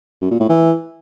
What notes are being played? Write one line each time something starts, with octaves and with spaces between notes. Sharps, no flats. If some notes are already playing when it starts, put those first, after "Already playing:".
F#2
A#2
A2
E3